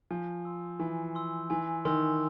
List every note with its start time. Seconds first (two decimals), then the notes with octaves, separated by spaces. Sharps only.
0.11 F3 G#5
0.45 C6 E6
0.80 E3 G#5
1.15 C6 E6
1.50 E3 G#5
1.85 D#3 C6 E6